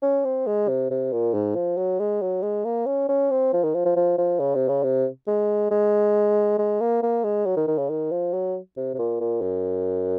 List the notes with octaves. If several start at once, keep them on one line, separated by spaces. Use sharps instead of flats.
C#4
C4
G#3
C3
C3
A#2
G#2
F3
F#3
G#3
F#3
G#3
A#3
C#4
C#4
C4
F3
D#3
F3
F3
F3
F3
C#3
C3
C#3
C3
G#3
G#3
G#3
A#3
A#3
G#3
F#3
D#3
D#3
C#3
D#3
F3
F#3
C3
C3
A#2
A#2
F#2